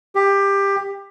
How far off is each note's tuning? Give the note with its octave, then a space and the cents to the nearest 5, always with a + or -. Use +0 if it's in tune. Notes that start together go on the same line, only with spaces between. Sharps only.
G4 +15